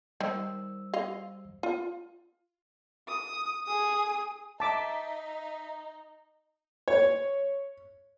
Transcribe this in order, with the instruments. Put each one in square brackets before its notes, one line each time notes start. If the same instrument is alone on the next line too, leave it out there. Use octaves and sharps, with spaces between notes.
[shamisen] D#3 [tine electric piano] G3 C5 E6
[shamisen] D#5 F5
F4
[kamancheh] D#6
G#4 D#6
[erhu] D#4 [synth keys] E5 B6 [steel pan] A5 D6
[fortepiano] C#5